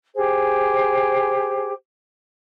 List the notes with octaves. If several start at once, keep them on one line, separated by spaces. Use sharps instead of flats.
G4 G#4 C5